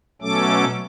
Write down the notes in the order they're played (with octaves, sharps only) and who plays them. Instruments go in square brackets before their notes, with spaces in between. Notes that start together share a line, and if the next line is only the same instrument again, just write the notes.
[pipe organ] B2 F#3 A3 C#4 A4 D6